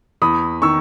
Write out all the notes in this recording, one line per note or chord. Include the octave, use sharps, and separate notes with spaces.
E2 B5 D#6
D#3 C#6 E6